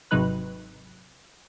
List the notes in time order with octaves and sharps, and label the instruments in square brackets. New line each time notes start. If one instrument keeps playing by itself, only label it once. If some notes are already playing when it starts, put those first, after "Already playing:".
[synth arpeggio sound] G#1 C3 F#3 D#4 B4 F#6